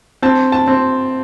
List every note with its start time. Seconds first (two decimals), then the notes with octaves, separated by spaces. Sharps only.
0.22 C4 A5
0.52 A5
0.68 C4